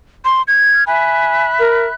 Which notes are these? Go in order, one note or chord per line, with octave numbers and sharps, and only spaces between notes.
C6
G#6
F6
E5 G#5 B5 F#6
A#4